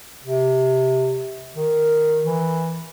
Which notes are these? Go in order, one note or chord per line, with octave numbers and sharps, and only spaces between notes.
C3
D#3
E3